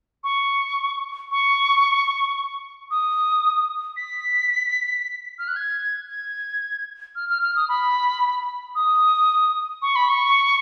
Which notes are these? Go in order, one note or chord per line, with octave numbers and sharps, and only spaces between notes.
C#6
C#6
D#6
B6
F6
F#6
G#6
G#6
F6
F6
F6
D#6
B5
D#6
C#6
B5
C#6